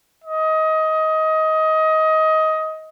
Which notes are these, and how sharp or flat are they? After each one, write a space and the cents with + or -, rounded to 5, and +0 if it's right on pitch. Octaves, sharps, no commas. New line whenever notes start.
D#5 +20